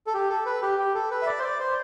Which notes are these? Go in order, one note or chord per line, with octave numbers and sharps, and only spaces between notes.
A4
G4
A4
B4
G4
G4
A4
B4
E5
D5
C5
D5
C5